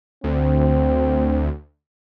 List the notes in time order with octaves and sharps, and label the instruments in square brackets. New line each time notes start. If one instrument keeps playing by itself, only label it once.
[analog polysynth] D2 [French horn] C4